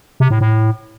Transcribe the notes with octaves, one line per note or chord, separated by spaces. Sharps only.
C3
A2
A2